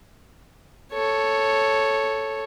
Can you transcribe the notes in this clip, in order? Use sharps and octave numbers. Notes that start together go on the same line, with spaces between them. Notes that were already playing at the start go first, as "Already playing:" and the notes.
A4 C#5